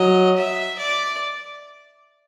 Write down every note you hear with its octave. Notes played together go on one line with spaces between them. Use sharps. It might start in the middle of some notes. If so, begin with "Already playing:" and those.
Already playing: F#3 D#5
E5
D5